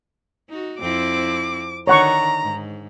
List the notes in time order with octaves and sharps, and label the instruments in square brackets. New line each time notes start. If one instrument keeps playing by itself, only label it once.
[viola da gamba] D#4 F#4
[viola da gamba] F2 C4 E4 [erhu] D6
[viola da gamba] D3 D#3 [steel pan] C#5 F#5 C#6 [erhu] A#5
[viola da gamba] G#2